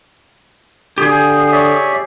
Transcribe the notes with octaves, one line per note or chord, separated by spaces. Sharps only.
D3 G4 G#4 D#6
C#5 D5 E5